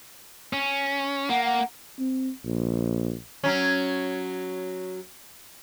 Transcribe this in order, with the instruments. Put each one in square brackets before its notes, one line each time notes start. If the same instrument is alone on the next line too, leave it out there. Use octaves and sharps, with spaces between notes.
[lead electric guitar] C#4
[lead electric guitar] A#3 [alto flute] F#5
[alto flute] F#5
[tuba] C4
A#1
[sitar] F#3 C#4